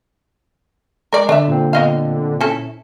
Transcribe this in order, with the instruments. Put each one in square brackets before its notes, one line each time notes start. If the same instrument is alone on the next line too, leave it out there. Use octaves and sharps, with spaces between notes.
[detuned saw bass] G#3 [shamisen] A#4 D5
[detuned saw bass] D3 [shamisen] D4 E5
[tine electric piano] A#2 C4
[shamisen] B3 D#5 F5
C#4 E4 A4